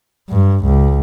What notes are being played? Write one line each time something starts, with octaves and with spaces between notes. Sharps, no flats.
G2
C#2